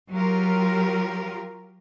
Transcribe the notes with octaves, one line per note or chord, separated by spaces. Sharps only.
F#3 F4 G4 A#4